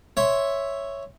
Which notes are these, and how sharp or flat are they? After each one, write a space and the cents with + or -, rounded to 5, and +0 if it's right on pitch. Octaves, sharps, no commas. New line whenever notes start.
C#5 +0 E5 +0 C6 +0